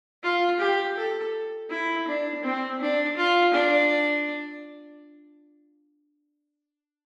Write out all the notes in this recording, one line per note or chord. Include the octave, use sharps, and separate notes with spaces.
F4
G4
A4
E4
D4
C4
D4
F4
D4